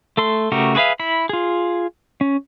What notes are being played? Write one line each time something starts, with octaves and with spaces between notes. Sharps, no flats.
A3 A4 C6
C#3 A3 F#4 G4 A#4
F#4 G#4 B4 E5 F5
E4 B5
F4 G#4
C#4